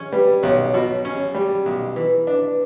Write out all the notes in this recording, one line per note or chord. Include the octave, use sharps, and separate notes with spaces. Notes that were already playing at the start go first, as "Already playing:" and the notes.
Already playing: C#4
G3 B4
B1 C#5
B2
C#4
G3
B1
E3 B4
D4